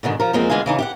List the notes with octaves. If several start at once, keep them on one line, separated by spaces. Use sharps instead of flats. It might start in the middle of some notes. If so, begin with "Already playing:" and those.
G#2 B2 D3 D#3
F3 A#4
E2 F3 G#3 A#3 C4
D2 E3 G#3 F4 F5 G#5
C#3 E3 D#4
G4 F5 F#5